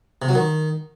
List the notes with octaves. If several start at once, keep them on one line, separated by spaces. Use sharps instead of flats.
C3
F#3
D#3